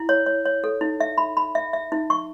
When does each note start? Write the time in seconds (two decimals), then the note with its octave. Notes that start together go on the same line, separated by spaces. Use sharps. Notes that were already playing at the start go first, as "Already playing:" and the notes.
Already playing: E4
0.09 C#5
0.26 C#5
0.45 C#5
0.64 A4
0.81 D#4
1.00 E5
1.18 B5
1.37 B5
1.55 E5
1.73 E5
1.92 D#4
2.10 C#6